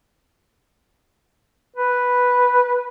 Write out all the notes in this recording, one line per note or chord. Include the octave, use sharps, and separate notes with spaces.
B4